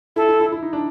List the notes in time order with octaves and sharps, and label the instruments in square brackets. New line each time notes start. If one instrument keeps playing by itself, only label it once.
[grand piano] E4 [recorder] A4
[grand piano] E4
E4
E4
D#4
D4